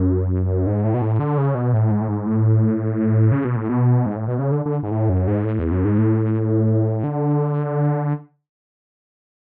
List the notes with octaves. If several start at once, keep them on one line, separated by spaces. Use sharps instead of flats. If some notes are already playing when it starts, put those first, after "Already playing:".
Already playing: F#2
G#2
A2
B2
A2
D3
C#3
B2
A2
G#2
A2
G#2
A2
C#3
B2
A2
B2
G#2
A2
B2
C#3
D3
D3
G#2
A2
F#2
G#2
A2
E2
F#2
G#2
A2
D3